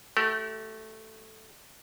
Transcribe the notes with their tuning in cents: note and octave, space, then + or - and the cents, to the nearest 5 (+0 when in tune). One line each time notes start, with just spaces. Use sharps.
A3 +0 G4 -40